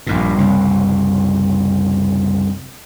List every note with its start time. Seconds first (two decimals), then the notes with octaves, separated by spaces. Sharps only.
0.07 A#1 G2 A#2
0.38 F#1 C2